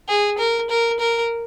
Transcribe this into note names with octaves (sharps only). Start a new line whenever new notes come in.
G#4
A#4
A#4
A#4